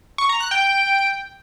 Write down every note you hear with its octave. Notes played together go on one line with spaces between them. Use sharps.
C#6
A#5
F#6
G5